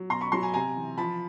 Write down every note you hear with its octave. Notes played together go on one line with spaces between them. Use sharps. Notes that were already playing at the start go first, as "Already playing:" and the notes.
Already playing: F#3
B2 A#5 C6
B5 C#6
F#3 A#5 C6
G#5 A#5
C3 G#5 A#5
E3
F3 A5 B5